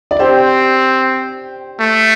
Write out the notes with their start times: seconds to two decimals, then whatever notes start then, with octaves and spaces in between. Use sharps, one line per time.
0.11 D5
0.19 C4 G4 C5
1.80 A3